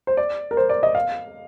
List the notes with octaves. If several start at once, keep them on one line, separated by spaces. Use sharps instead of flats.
C5
D5
A#4
C5
D5
D#5
F5